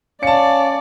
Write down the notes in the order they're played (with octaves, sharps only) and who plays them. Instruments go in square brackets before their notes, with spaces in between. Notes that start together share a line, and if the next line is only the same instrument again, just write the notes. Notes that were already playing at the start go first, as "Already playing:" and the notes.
[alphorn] C#4 [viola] D5 [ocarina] F5 [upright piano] A5 C#7